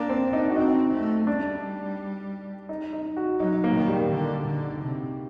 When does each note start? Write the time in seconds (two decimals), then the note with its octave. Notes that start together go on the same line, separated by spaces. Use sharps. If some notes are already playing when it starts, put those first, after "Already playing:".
Already playing: A#3 D4
0.09 C4
0.33 D#4
0.50 F#4
0.56 C4 D#4
0.92 A3
1.27 G3 D4
2.69 D#4
2.93 D#4
3.17 F#4
3.40 F#3 D#4
3.64 A#3
3.75 D#3
3.87 G3
4.10 D3
4.46 D3
4.81 C3